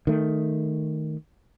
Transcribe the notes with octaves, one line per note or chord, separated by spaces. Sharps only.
D#3 A3